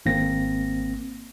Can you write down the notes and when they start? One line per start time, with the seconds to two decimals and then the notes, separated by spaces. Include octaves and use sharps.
0.06 G#1 A#3 C4 A#6